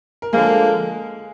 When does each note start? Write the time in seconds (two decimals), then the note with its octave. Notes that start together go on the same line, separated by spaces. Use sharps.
0.22 A#4
0.33 D3 F3 G#3 A#3 G#4